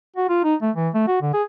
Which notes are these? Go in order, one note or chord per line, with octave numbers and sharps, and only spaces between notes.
F#4
F4
D#4
A3
E3
A3
F#4
D3
G#4